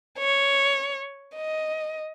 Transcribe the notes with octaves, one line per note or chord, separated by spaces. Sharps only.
C#5
D#5